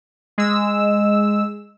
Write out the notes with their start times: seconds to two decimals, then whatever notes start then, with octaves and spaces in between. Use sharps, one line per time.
0.38 G#3 E6